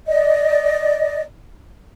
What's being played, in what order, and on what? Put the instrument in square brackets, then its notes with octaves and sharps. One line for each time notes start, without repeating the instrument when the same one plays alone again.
[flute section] D5 D#5